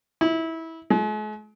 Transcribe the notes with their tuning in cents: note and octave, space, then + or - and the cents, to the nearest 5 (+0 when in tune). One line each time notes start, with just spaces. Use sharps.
E4 -20
G#3 +45